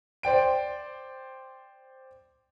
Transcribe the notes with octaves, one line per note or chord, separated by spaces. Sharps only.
C5 D5 G5 D7